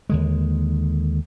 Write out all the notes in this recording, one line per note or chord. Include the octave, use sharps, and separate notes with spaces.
D#2 D3 G#3